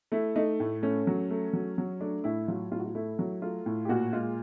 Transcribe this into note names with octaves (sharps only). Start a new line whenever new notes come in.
A3 E4
A3 D#4
A2
A3 C#4
F#3
A3
F#3
F#3
A3 D4
A2 E4
F#3 F4
A2 F4
F#4
F4
A3 E4
F#3
A3 F4
A2
G4
A#2 F#4
G#3 F4